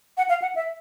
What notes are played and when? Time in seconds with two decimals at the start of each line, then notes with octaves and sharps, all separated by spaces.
0.17 F#5
0.29 F5
0.42 F#5
0.55 E5